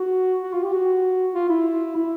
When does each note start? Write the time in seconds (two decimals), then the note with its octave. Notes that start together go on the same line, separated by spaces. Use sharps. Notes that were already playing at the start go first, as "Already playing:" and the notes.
Already playing: F#4
0.43 F#4
0.53 F4
0.63 G4
0.73 F#4
1.34 F4
1.49 E4
1.95 E4